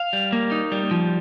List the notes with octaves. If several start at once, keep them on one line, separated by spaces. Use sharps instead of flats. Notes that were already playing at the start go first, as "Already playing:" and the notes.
Already playing: F5
G3
A#3
D#4
G3
F3